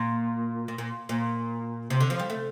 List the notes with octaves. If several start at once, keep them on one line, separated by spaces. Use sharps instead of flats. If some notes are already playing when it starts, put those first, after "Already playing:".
Already playing: A#2
A#2
A#2
A#2
C3
D3
F3
G3
A3